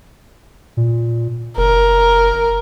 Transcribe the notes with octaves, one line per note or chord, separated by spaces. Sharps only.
A#2
F#1 A#4